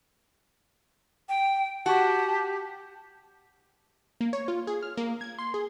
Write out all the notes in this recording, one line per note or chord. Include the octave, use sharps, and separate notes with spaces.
G5
F#4 G4 A5
A#3
C#5
F4
G#4
F6
A#3
G#6
C6
G#4